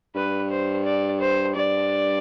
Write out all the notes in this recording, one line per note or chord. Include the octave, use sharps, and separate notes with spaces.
G2 B4
C5
D5
C5
G2 D5